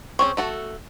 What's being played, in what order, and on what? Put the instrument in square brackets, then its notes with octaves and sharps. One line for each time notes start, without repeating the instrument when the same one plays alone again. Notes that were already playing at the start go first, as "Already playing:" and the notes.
[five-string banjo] C4 C#4 G#4 [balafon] C#6
[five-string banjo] A3 F#4 A4